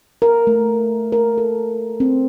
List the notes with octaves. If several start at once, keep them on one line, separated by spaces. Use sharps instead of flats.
A#4
A3
A#4
A4
C4